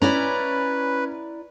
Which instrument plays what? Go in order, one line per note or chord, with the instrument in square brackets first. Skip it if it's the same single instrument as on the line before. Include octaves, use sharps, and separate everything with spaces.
[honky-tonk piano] C#4 [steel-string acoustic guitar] E4 D5 A#5 [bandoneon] B4